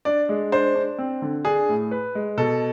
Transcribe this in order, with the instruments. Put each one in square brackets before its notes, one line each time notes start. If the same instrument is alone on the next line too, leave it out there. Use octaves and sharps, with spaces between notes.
[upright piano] D4 [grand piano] D5
[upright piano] G#3
[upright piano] D4 [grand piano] C5
[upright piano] D4
C4
D3
[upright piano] D4 [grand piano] G#4
[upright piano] A2
B4
G#3
[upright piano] B2 [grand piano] A4